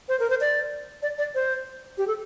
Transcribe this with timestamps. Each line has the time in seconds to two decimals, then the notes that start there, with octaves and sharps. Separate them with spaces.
0.08 C5
0.20 A#4
0.30 C5
0.41 D5
1.02 D5
1.18 D5
1.35 C5
1.98 G4
2.07 A4